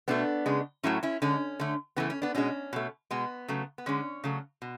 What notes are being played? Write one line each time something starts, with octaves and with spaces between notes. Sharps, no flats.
B2 A3 B3 D4
C#3 G#3
A2 F#3 A3 C#4 E4
C#4 E4
D3 G#3 C#4
D3 A3
C#3 E3 A3 B3
C#4
B3 D4
B2 G#3 C#4
B2 A3
B2 G#3 B3
C#3 F#3 A3
B3
D3 G#3 C#4
C#3 F#3 A3
B2